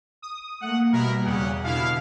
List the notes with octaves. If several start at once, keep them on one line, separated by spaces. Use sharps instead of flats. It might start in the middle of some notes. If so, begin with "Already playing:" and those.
D#6
A3 A#3 F#5
B2 G3 E4 A#4
E2 C#3 G4 G#4 F#5
B2 D3 E4 F5